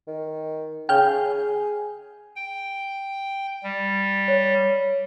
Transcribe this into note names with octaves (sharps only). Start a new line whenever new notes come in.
D#3
C#3 G5 F6 G6
G#4
G5
G3
C#5